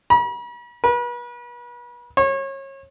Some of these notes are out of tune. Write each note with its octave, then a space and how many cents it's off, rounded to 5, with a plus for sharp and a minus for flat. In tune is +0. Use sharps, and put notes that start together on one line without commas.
B5 -45
B4 -35
C#5 -30